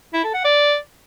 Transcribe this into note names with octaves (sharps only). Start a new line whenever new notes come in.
E4
A4
F#5
D5